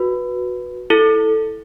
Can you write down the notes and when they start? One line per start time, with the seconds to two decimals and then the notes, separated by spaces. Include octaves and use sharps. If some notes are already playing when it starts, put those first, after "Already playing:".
Already playing: F#4 B4
0.90 E4 A4